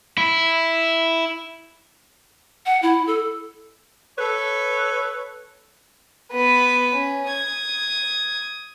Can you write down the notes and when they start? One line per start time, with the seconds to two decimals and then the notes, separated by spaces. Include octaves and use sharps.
0.18 E4
2.66 F#5
2.82 E4
3.07 A4
4.18 A4 B4 C#5
6.33 B3 B4
6.96 C#4
7.30 D#6 G#6